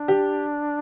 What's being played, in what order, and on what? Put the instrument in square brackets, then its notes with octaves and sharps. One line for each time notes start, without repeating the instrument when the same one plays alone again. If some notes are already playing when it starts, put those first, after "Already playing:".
Already playing: [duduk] D4
[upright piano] G4